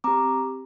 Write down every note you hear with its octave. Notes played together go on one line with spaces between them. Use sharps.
C4 G4 A#5 D6